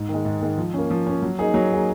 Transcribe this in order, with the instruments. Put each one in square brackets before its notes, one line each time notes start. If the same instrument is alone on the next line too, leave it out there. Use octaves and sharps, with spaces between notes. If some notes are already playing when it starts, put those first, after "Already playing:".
Already playing: [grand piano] G#2
D#3 G#3
G#2
D#3 G#3
F3
A#3 C#4
F3
A#3 C#4
F#3
A#3 D#4 G#4
F#3
A#3 D#4 G#4